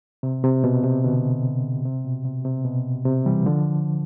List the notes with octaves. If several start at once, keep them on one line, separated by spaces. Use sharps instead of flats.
C3
C3
B2
C3
B2 D3
C3
B2
C3
C3
B2
C3
E3 G3
D3 F3